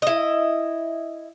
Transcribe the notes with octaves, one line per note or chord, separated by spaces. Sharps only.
E4 D#5